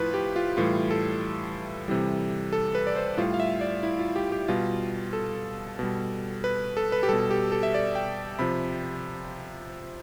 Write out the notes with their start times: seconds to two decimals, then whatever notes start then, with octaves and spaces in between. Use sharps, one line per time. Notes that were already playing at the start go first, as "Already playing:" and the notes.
Already playing: A2 F3 E4 F4 B4
0.14 G4
0.36 F4
0.57 A2 E3 G3 F4
0.91 A4
1.88 C3 E3 G3
2.52 A4
2.75 B4
2.87 D5
2.96 C5
3.17 A2 G3 F4
3.34 F5
3.40 E5
3.61 D5
3.83 E4
3.99 F4
4.16 G4
4.32 G4
4.48 B2 G3 F4
5.13 A4
5.79 B2 G3
6.44 B4
6.77 A4
6.92 B4
7.03 G4
7.09 B2 G3 A4
7.31 G4
7.52 A4
7.63 E5
7.74 D5
7.95 G5
8.39 C3 F3 B5